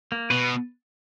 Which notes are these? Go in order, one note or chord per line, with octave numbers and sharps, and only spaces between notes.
A#3
B2 B4